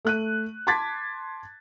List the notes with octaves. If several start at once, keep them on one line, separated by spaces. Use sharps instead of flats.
A3 F#6 D#7
A5 C6 D6 G#6 A6 B6